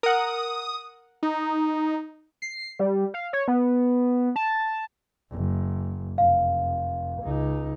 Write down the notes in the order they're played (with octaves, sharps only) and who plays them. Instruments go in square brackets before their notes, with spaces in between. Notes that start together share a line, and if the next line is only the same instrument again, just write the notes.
[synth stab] A#4 F#5 [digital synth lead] D#6
[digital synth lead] D#4
[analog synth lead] C7
G3
F5
C#5
B3
A5
[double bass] F#1
[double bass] F1 [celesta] F5
[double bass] C#2 D#4